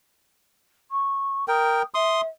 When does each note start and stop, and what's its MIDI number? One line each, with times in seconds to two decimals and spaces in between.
0.91 1.48 85
1.48 1.82 70
1.48 1.82 79
1.48 1.86 87
1.94 2.28 76
1.94 2.21 84
1.94 2.21 87